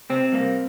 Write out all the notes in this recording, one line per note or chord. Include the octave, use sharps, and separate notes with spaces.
C3 C4
G3 A#3